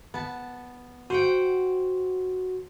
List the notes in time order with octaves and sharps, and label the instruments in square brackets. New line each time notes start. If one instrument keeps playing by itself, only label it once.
[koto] B3 A5
[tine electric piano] F#4 [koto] C5 F#5 G5